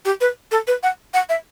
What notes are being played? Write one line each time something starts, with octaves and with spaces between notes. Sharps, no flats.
G4
B4
A4
B4
F#5
F#5
E5